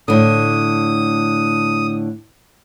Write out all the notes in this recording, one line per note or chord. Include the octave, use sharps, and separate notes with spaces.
A2 D3 D#6